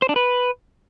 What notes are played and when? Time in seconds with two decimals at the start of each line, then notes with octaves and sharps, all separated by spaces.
0.02 C5
0.09 D4
0.16 B4